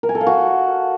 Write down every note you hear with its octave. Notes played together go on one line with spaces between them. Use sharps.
A#4
G#5
A4
F5
F#4